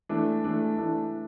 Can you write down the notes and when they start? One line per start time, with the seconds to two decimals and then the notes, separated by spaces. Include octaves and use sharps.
0.09 E3 A3 D4
0.44 E3 A3 D4
0.78 E3 A3 D4